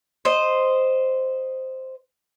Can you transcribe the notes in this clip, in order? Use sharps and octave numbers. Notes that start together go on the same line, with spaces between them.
C5 D#5